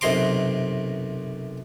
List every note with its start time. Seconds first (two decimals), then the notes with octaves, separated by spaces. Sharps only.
0.01 B1 F#2 C3 D#5 C6 D6